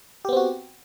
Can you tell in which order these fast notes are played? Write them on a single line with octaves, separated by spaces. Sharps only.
G4 B3 C4 F#4